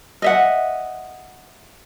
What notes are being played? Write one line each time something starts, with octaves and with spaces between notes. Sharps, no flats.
D#5 E5 F#5